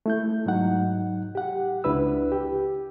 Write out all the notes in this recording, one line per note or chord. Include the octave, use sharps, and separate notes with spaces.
A3 E4 G6
G#2 F#3 D#4 F#5
G4 F#5
C#2 D4 E4 B4 E6
G4